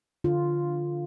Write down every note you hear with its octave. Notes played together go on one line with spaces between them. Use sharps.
D3 F4